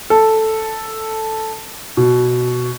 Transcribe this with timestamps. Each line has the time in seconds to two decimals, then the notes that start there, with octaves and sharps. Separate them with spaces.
0.10 A4
1.97 B2